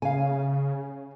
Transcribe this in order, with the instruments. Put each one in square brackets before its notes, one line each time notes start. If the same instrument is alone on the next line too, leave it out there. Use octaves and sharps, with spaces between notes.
[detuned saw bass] C#3 [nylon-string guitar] F5 G#5